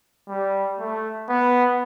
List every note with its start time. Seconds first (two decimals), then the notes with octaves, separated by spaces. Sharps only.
0.29 G3
0.79 A3
1.29 B3